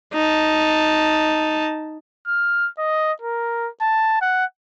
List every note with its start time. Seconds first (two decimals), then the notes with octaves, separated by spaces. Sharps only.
0.14 D#4 A5
2.28 F6
2.79 D#5
3.22 A#4
3.82 A5
4.22 F#5